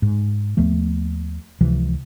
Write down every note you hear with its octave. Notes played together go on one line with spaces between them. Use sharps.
G#2
D#2 F3 A3 B3
C#2 C3 E3 F3